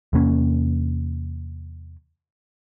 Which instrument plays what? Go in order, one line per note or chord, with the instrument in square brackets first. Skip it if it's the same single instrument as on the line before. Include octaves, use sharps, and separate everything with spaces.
[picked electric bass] E2 C3 A#3 C#4